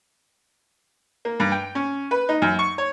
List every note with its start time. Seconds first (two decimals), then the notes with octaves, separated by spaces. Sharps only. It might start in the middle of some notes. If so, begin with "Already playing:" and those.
1.25 A#3
1.40 G2
1.52 G5
1.75 C#4
2.11 B4
2.29 D#4
2.42 F#2
2.59 C#6
2.78 C#5